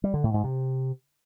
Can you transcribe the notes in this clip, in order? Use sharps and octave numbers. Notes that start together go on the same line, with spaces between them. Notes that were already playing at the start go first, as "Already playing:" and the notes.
G3
D3
A2
G#2
C3